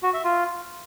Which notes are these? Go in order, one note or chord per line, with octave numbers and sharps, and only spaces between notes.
F#4
E5
F4